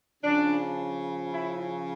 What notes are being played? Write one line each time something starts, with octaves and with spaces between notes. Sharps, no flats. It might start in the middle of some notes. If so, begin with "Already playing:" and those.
C#3 F3 C#4 D4
E4